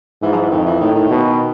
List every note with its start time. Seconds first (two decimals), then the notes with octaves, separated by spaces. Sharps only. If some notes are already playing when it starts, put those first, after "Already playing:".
0.22 G#2 E3
0.32 F3
0.36 E3
0.51 F2 D#3
0.66 E3
0.80 A2 D#3
0.95 D#3
1.09 B2